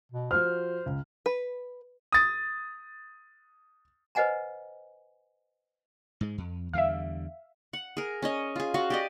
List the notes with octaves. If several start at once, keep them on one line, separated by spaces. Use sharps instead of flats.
B2
F3 F#4 C5 F6
C#2
B4
D#6 A6
B4 C5 D#5 F#5 G#5 A#5
G#2 G#3
F2
E2 D3 G3 E5 F5
F#5
G#4 A#4
C#4 C#5 D#5
F4 G#4
F#4 F5
G4 D5 D#5